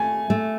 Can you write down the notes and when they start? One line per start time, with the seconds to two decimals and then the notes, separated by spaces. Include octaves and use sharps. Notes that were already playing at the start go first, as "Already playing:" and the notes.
Already playing: A3 G#5
0.30 A3